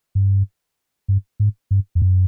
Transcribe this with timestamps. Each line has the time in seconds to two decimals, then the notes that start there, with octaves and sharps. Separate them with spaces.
0.15 G2
1.08 G2
1.40 G#2
1.71 G2
1.95 F2
2.02 F#2